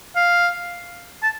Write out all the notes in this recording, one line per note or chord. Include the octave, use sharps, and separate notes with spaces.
F5
A5